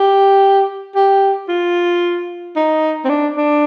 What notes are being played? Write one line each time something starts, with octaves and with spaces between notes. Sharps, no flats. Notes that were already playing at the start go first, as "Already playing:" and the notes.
Already playing: G4
G4
F4
D#4
C4
D4
D4